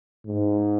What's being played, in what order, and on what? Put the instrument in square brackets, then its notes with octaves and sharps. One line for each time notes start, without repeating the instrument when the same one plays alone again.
[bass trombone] G#2